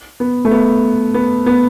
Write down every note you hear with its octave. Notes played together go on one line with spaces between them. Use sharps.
B3
A3
B3
B3
B3